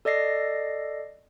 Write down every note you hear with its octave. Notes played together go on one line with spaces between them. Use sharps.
A4 D5 D#5 A#6 C7